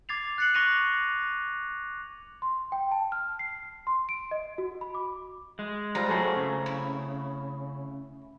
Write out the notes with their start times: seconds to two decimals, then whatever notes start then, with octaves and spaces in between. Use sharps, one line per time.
0.09 D6 G#6 A6 C7 F7
0.38 F#6 A6 C7 C#7 F#7
0.54 C#6 D6 A#6 C#7 D#7 F7
2.42 C6
2.72 G5
2.91 A5
3.12 F6
3.39 C7
3.87 C6
4.09 D7
4.31 D#5
4.58 F#4
4.81 B5
4.95 D6
5.59 G#3
5.95 G3 C4 F4 A#5
6.09 F#2 F#3 A3 G#4
6.36 C#3
6.66 E4